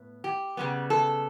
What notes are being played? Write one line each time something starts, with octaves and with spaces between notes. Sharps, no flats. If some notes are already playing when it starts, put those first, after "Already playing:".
Already playing: A2 B3
G4
C#3 G3 B3
A4